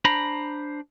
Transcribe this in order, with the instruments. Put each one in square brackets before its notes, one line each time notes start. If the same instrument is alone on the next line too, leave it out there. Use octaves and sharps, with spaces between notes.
[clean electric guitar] D4 C5 A#5 B5